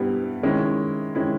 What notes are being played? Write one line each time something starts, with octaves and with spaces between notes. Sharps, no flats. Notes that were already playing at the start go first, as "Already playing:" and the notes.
Already playing: G2 G3 B3 E4
D#3 G#3 C#4 E4
D#3 G#3 C#4 E4